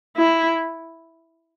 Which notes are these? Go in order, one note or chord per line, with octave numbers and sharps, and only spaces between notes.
E4